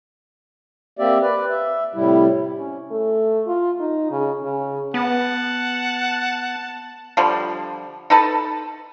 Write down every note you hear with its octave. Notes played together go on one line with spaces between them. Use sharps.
A#3 C4 G4 D5 E5
B4 D5
E5
A2 C3 G3 E4
C#4
A3
F4
D#4
C#3
C#3
B3 F#5 A5
D3 F3 G3
D#4 A4 B4 A5